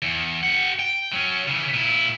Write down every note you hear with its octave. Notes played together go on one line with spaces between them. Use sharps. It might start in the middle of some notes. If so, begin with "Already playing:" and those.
E2
G4 F#5
G5
F#3 C#4
C#3 E3
A#2 E4